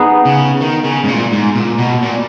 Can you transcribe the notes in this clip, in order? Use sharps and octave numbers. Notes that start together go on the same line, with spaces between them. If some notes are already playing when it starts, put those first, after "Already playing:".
Already playing: B3 D#4 G#4
C#3
D#3
C#3
G#2
A#2
G#2
A#2
B2
A#2